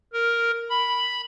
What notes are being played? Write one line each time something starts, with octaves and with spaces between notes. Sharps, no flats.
A#4
B5